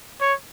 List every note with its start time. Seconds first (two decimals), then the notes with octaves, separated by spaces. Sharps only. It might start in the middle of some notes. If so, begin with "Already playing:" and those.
0.21 C#5